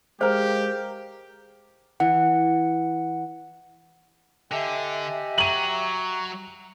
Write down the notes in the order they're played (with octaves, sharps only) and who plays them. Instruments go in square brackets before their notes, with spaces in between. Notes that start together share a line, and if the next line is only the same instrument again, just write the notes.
[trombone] G#3 [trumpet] G4 [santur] A#4 F5 [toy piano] C5
[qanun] E3 [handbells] F#5
[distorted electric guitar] D3 [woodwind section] G4 E5 [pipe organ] D#5 G#5
[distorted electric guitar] F#3 [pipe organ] A#5 C#6 [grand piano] D#7 F#7